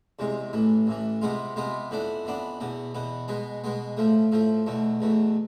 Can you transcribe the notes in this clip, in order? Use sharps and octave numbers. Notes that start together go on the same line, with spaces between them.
E2 C3 G#3
A1 A2 E3
A1 A2 E3
C3 G#3 B3 F4
C3 G#3 B3 F4
F2 E3 B3 D4
F2 E3 B3 D4
E2 B2 B3
E2 B2 B3
B2 G#3 B3
B2 G#3 B3
A2 F3 A3
A2 F3 A3
E2 B2 A3
E2 B2 A3